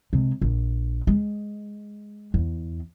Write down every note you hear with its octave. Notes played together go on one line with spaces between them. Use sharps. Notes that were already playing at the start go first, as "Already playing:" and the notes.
C3 G#3
A#1
G#3
E2